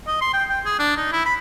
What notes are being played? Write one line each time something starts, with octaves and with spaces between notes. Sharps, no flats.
D#5
C6
G5
G5
G#4
D4
D#4
E4
B5